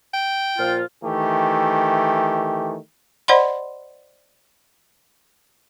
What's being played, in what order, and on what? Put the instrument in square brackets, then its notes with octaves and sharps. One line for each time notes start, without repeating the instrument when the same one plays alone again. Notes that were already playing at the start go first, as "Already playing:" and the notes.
[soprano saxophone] G5
[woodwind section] A#2 F3 F4
[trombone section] D#3 E3 A3 G4
[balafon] C5 D5 D#5 F#5 B5 C6